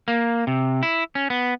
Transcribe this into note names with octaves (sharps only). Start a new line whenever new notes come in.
A#3
C3
E4
C#4
B3